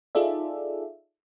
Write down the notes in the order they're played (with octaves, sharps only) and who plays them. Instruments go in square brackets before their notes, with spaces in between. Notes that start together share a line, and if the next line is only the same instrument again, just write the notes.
[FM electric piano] D#4 F4 G#4 A4 D5 E5